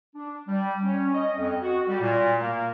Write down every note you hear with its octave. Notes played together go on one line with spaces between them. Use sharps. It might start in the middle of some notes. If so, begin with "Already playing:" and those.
D4
G3
C#4
D#5
F2
F#4
G3
A#2
A#3